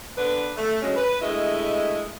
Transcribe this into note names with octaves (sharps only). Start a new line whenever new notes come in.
D3 B3 D4 B4
A3
G2 F#3 G#3 C#4
B4
G2 G#3 A3 E4 D#5